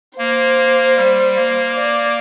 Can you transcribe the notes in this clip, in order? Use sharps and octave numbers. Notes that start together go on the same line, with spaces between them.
A#3 C5
G3
A#3
D5